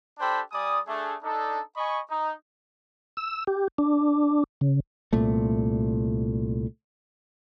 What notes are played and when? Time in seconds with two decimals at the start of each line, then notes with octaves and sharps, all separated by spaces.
0.19 D4 G4 A4 C5 G5 B5
0.52 G3 D5 G#5 D#6
0.87 A3 D4 G#4
1.23 D4 D#4 A4
1.76 D#5 G#5 B5 C#6
2.09 D#4
3.17 E6
3.47 G4
3.78 D4
4.61 C#3
5.13 C2 A#2 A3